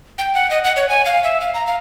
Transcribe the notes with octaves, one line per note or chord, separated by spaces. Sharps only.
G5
F#5
D#5
F#5
C#5
G#5
F5
E5
F5
A#5
F5